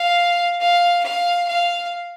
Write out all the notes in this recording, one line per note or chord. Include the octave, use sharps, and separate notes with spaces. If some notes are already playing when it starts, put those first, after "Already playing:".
Already playing: F5
F5
F5
F5